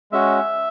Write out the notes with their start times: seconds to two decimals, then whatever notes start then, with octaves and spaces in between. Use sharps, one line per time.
0.12 G#3 C#4 F#4 E5